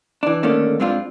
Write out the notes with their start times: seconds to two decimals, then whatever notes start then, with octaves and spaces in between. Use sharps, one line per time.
0.23 E3 D4
0.43 D3 D#3 A3 A#3 C#4 D4
0.80 G2 G#3 C4 D4 F4